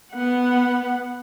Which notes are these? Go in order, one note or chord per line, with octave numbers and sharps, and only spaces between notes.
B3 F#5